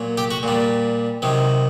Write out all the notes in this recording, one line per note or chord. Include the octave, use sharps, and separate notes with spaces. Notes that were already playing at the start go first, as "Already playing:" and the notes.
Already playing: A#2 F#3
G4
F#4
A#2 G3
C3 D#3 F#3